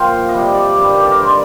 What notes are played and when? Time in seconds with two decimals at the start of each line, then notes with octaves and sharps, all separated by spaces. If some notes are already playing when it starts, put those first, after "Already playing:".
Already playing: A#2 F3 F5 G5
0.29 C3 G3 D#5
0.54 D5
0.78 G2 D#3 G3 D5
0.96 G4
1.05 A4
1.11 A#4
1.20 C5
1.28 D#3 G3 D5